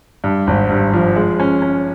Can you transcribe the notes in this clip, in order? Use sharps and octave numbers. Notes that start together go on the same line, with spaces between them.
G2
G#1
G2
F3
G#3
C#4
C#4